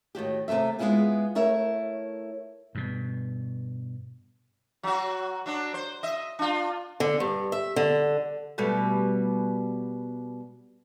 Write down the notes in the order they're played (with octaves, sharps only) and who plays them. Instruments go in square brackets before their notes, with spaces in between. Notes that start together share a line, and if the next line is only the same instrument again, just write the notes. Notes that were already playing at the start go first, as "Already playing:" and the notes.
[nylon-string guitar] A2 D#3 F#4 G4
D#2 C3 G#3 A3 E5
G#3 B3 C#4 E4 F4 G#4
A3 E4 A#4 C#5 E5
[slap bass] G2 B2
[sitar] F#3 F#4
F#3 D4
C5
D#5 E5
D4 F4
[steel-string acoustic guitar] D3
G2
E5
D3
[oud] B2 G3 A3